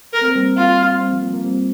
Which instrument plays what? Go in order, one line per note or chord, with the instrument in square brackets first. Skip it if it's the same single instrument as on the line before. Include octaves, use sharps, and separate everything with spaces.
[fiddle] A#4
[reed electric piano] C4
A#3
G3 C4
[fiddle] F4
[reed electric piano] G3 C4
F3 A#3
F3 A#3
F3 A#3
G3 C4